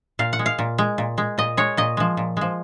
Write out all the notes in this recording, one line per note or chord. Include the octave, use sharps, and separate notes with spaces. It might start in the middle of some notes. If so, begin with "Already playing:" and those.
A#2 F5
F#5
G#3
F5
A#2
G#3
A#2
G#3
A#2 D#5
G#3 C#5
A#2 D#5
F3 G#3
A#2
F3 G#3